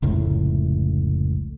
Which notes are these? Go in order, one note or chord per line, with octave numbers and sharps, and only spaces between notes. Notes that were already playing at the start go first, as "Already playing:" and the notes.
F1 C#2 A2